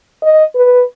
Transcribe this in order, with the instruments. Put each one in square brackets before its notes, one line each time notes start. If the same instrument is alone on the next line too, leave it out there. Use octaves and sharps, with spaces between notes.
[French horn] D#5
B4